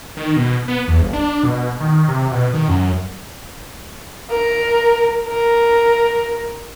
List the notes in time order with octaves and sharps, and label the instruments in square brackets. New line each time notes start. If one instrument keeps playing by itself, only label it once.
[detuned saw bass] D#3
B2
B3
E2
G1
D4
B2
D#3
C3
B2
D#3
F#2
[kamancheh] A#4
A#4